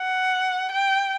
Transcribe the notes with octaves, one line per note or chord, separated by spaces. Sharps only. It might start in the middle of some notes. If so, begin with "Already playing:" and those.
Already playing: F#5
G5